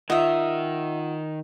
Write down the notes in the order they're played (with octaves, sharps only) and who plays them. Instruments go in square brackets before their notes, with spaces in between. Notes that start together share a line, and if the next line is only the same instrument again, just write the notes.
[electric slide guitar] D#3 [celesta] F4 F#5 [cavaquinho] D#5 E5